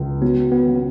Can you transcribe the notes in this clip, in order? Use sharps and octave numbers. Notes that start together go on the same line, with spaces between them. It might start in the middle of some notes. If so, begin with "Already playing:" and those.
Already playing: C#2
F#3 B3
B3
C#3